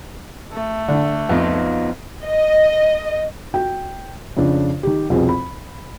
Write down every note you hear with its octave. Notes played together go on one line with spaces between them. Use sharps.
A3
D3
F2 B3 D#4 F4
D#5
F#4 G5
F2 C#3 D4
D#3 G4
C2 F2 B2 C4 G#4
B5